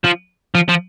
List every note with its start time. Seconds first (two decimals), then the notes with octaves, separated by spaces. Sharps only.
0.04 F3
0.55 F3
0.69 F3